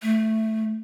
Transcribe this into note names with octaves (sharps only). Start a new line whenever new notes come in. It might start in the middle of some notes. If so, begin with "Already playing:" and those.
A3